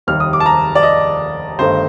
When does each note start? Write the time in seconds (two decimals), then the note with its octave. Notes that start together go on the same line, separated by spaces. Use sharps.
0.07 F1 D#2 D#3 G3 F6
0.20 D#6
0.33 D6
0.40 A5
0.46 A#5
0.75 D5
0.83 D#5
1.59 G1 G2 D#3 A3 D#4 C5